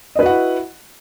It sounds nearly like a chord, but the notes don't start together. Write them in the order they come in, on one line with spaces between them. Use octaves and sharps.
D#5 B4 F#4 F#5 E4